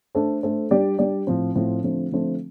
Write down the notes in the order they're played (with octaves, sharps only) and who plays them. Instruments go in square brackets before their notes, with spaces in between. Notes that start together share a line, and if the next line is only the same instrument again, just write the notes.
[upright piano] A3 D4 A4 C5
A3 D4 A4 C5
G3 D4 G4 D5
G3 D4 G4 D5
A2 F3 C4
A2 F3 C4
D3 F3 A3 C4
D3 F3 A3 C4